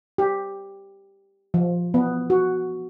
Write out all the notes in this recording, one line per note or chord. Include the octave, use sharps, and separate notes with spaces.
G4
F3
B3
F#4